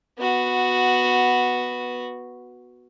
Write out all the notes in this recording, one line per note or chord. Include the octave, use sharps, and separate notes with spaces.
B3 F#4